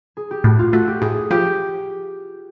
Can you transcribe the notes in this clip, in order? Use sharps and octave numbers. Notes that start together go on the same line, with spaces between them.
G#4
G4
A2 F#4
F4
A3 F#4
G4
A2 G#4
F3 G4